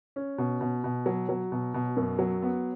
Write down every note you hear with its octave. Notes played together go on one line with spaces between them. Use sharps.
C#4
B2
B2
B2
F#3
F#3
B2
B2
F#2
F#3
B3